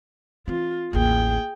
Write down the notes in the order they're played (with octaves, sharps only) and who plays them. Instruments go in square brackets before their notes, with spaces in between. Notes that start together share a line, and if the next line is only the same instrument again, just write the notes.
[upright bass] E3 C4 [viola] F4
[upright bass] A1 D#2 [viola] G#4 G5